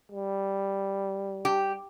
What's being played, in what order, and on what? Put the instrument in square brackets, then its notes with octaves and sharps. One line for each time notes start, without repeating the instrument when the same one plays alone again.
[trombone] G3
[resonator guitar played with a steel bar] G4